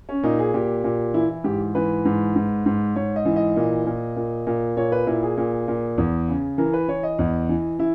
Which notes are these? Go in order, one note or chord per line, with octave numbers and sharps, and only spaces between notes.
C#4
A#2 D#4
G#4
A#2 G4
A#2
E3 E4
E4
G#2 G4
E3 B4
G#2
G#2
G#2
G#2 C#5
D#5
E3
D#5
A#2
A#2
A#2
A#2
A#2 C#5
B4
A#2 E4
G#4
A#2
A#2
E2
C#3
E3 A#4
B4
E3 C#5
D#5
E2
E3
E3 E4